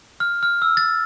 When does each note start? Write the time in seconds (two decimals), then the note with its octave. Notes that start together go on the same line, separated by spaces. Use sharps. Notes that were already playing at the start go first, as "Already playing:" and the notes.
0.20 F6
0.43 F6
0.62 E6
0.77 A6